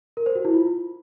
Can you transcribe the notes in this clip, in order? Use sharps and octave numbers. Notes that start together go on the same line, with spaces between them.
A#4
C5
F#4
E4
F4